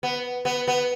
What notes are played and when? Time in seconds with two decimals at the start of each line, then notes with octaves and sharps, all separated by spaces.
0.03 B3
0.45 B3
0.68 B3